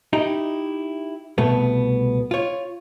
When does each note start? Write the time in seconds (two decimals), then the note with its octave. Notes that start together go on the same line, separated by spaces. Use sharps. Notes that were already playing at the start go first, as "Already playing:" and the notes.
0.13 D#4 E4 G4
1.38 C2 B2 A3 B3
2.31 F4 C#5